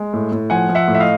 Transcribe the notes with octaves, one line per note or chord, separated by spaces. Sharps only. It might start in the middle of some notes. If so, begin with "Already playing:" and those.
Already playing: G#3
A2
A2
F3 F#5 G#5
F3
E5 F#5
A2
E5
D#5 F5